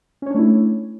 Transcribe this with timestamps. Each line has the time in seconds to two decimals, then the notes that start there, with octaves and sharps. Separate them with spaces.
0.22 C#4
0.26 C#5
0.30 D4
0.35 A3
0.39 E4